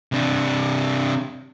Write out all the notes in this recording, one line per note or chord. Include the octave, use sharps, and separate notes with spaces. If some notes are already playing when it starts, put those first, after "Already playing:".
C3 D4